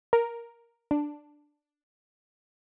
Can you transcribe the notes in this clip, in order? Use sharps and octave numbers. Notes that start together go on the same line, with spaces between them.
A#4
D4